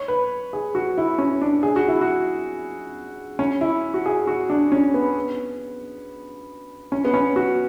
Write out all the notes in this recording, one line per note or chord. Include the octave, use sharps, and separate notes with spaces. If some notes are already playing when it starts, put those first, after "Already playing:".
Already playing: C#5
B4
G#4
F#4
E4
C#4
D4
G#4
F#4
E4
F#4
C#4
E4
F#4
G#4
F#4
D4
C#4
B3
C#4
B3
C#4
F#4